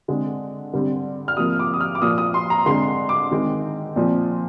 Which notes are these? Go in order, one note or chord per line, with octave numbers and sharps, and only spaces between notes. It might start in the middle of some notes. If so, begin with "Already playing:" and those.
D3 G#3 C4
D3 G3 C4
F6
C3 F3 A#3 D#6
D6
D#6
F6
D6
A#2 F3 A#3 D#6
D#6
C6
A#5
D3 G#3 C4 C6
D6
D#3 G#3 C4
A#2 F3 C4